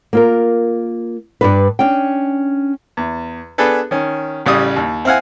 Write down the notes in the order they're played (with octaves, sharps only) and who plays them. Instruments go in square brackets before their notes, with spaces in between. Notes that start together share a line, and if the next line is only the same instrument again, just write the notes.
[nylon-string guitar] A#3 F4 A#4
G2 D4 B4
C#4 D4 G5
[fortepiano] E2
B3 D4 G#4 A4 B4
D#3 C#4
A1 C#3 G3 D5 D#6
D#2
C4 E4 F5 F#5 G#5